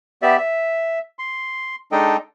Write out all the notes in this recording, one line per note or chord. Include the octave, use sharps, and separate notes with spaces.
B3 G4 D5 E5
E5
C6
G#3 D4 D#4 A4 D#5 G5